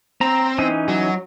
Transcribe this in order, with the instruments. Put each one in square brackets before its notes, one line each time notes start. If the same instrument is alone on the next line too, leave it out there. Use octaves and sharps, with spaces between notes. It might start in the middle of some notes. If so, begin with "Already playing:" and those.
[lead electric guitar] C4 [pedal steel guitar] A#5
[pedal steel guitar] E3 C#4 D#4
[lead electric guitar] F#3